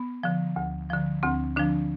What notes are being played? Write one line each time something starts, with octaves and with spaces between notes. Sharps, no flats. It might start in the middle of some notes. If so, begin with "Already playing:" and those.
Already playing: B3
D3 F3
D2
D3 F3
D2 C4
D3 F3 D4